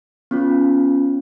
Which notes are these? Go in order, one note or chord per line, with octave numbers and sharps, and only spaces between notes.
B3 C#4 F4